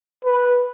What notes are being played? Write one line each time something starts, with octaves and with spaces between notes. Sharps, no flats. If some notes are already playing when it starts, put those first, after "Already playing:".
B4